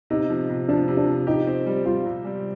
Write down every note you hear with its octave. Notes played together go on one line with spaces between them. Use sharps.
C3 D#4
F3
C3
F3 D4
C3
D4
F3
D#4 G4
C4
G3
G3 F4
C3
G3